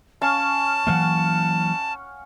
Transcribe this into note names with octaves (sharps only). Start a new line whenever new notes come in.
C#4 F5 A5 C#6
E3 F#3 A#3 F5 F#5